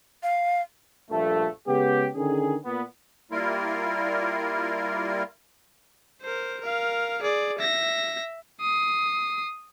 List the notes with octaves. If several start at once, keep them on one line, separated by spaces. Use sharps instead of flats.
F5
A#1 G2 F3 A3
C#3 G#3 B3 G4
D3 D#3 C#4 G#4
A#2 B3
G3 A#3 E4 F4 A#4
A#4 C5
A#4 F5
G#4 D5
E5 A#6
D#6 C7